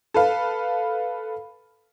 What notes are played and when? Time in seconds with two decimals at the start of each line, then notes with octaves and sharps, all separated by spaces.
0.14 A4 B4 F5